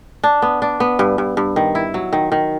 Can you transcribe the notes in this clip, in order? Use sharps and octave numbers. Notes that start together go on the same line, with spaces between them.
D4
B3
D4
B3
G2
G2
G2
D#3
E4
F#3
D#3
D#3